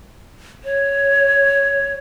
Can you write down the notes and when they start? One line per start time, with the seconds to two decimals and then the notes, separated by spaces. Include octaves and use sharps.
0.64 C#5